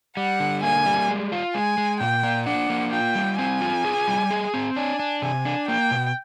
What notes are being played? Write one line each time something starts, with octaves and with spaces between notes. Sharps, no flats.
G3 F#5
D3
A#3 G#5
G3
G#3
F4
G#3 G#5
G#3
A#2 G5
A#3
D4 F#5
A#3
F4 G5
G3
C4 G#5
F4
G#4
G3
G#4
C4
D4 G#5
D4
C3 G#5
D4
A#3 G5
B2